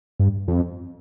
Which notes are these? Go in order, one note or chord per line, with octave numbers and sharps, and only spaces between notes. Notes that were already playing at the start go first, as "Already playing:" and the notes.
G2
F2